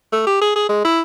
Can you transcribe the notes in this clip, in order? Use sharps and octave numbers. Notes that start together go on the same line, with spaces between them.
A3
G4
G#4
G#4
G#3
E4